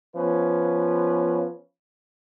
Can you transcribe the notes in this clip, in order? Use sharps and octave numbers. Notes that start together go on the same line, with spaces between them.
F3 B3 C#4 B4